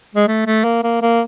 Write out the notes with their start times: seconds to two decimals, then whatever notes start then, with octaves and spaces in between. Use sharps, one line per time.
0.15 G#3
0.28 A3
0.46 A3
0.64 A#3
0.83 A#3
1.02 A#3